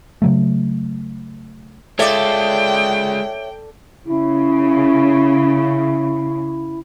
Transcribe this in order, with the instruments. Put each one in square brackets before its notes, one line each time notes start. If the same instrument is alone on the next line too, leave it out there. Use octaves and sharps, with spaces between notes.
[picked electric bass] C#3 F#3 A3
[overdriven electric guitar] G#3 F4 [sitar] A4 D5 [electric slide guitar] C#5 E5 [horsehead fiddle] G5
[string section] C#3 [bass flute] E4